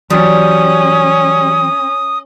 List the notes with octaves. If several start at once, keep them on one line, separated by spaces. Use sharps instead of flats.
E3 F#3 G3 C#4 F#4 D#6